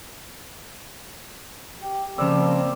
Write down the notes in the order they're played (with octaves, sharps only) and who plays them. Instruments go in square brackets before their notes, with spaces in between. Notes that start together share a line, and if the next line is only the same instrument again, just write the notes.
[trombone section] G4
[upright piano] C#3 E6 [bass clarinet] F3 [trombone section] A#3 C4 [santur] D5